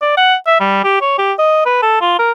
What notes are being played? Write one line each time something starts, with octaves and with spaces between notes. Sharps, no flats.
D5
F#5
E5
G3
G4
C#5
G4
D#5
B4
A4
F4
A#4